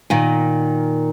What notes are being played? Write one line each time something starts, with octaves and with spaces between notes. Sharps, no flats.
A#2 D#3